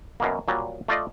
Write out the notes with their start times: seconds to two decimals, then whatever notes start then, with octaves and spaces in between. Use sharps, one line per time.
0.20 F#2 B2 A#3
0.48 A#2 F#3 G3
0.88 A3 F4 D5 D#5